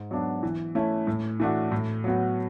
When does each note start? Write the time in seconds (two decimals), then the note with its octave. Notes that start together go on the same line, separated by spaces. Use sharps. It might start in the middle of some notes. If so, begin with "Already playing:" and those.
Already playing: G#2
0.11 F#3 B3 D4 F#4
0.43 E3
0.75 A3 C#4 E4
1.07 A2
1.40 E3 A3 D4 F#4
1.72 A2
2.04 F#3 B3 F#4